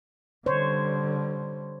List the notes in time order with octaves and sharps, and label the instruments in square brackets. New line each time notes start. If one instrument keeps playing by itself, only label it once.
[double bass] D3 G3 [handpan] C5 C#5